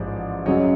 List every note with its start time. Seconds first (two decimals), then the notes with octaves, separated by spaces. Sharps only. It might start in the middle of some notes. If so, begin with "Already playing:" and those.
Already playing: A1 G#2 F3 C5 D5
0.46 F#2 C#3 F#3 C#5 D#5